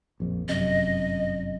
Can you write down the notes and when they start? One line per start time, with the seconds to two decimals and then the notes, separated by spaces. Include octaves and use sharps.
0.20 A#1 F2
0.49 G1 F#2 C3 D#5